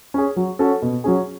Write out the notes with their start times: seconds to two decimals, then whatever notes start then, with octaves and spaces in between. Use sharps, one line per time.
0.14 C#4 G#4
0.36 F#3
0.59 C#4 F#4 A4
0.82 B2
1.04 F#3 C#4 G#4